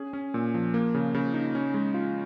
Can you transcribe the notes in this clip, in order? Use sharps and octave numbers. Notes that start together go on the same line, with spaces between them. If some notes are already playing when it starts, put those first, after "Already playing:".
Already playing: C#4 G#4
C#4
A#2
F3
A#3
C#3
C#3
D#4
C#4
G#3
F4